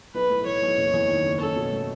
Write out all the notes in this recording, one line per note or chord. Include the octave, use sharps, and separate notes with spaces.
B1 B4
A2
E3 C#5
B1
F#1
E2
D#3
F#1
C#4 A4
B2
A3